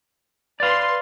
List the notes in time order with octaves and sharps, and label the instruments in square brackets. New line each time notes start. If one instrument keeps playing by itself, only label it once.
[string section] B4 C6 [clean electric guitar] D5 F5